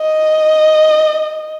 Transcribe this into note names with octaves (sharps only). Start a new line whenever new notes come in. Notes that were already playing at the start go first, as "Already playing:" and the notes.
Already playing: D#5